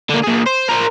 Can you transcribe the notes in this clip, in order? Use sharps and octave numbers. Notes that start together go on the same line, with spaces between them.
D3 A#3
A#2 G#4
C5
A#4 C5